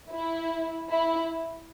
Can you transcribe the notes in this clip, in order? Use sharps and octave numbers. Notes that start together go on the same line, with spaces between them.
E4
E4